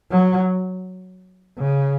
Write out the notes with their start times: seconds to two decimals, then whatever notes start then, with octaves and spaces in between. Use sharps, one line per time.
0.11 F#3
1.58 C#3